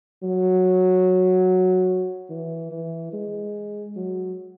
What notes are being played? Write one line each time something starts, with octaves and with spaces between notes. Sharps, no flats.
F#3
E3
E3
G#3
F#3